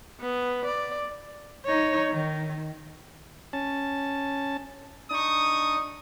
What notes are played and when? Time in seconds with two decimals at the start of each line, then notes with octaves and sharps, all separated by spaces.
0.21 B3
0.65 D5
1.65 D#4 C#5
2.11 D#3
3.53 C#4 A5
5.11 D4 D#4 C#6 D#6